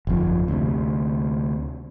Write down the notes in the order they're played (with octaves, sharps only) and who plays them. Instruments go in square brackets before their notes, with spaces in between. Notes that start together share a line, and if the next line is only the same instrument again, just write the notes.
[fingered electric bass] G1 F2 F3
D2 C3